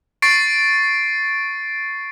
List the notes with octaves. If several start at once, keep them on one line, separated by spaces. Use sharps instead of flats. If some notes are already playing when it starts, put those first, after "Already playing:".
C#6 A6 C7 D7